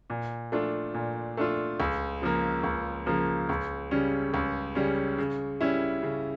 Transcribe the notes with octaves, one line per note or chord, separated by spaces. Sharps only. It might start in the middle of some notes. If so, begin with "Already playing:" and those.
A#2
A3 D4 F4
A#2
A3 D4 F4
C#2
C#3 F3 A#3
C#2
C#3 F3 A#3
C#2
C#3 G3 C#4
C#2
C#3 G3 C#4
C#3
G3 C#4 E4
C#3